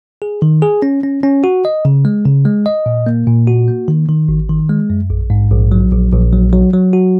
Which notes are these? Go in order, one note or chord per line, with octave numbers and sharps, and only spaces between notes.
G#4
D#3
G#4
C#4
C#4
C#4
F#4
D#5
C#3
G#3
C#3
G#3
D#5
A#2
A#3
A#2
F#4
A#3
D#3
D#3
G#1
D#3
G#3
F#2
A#1
G#2
A#1
F#3
A#1
A#1
F#3
F#3
F#3
F#4